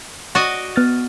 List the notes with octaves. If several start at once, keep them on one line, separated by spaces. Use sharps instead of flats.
F#4 D5 D#5
B3 F6 A6